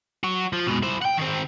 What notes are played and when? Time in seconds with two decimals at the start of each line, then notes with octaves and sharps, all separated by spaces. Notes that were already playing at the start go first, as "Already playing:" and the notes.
0.24 F#4 C#5
0.53 F3
0.67 G#2 B2
0.83 E4 C5
1.02 F#5 G5
1.17 D#3 C4